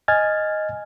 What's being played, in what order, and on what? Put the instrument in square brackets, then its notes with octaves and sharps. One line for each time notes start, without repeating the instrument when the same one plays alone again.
[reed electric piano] D#5 G#5 F6 G#6 A6